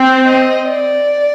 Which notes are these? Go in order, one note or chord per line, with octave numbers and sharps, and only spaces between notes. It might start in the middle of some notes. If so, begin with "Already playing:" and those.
Already playing: C4
D#5
D5